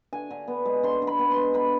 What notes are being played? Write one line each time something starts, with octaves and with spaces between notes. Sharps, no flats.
D3 G#5
D3
B3
G#3
D3 C6
D3
B5
B3
C6
G#3
D3 B5